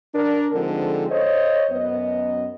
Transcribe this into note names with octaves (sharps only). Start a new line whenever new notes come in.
D4 A#4
D3 F3 G#3 C4 D#4 A4
C5 C#5 D#5
F#2 B3 D#5